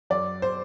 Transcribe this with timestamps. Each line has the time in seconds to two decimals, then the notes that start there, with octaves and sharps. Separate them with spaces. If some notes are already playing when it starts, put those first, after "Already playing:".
0.10 F#2 D5
0.42 C5